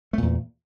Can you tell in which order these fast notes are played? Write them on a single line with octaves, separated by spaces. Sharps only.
A3 A#2 E2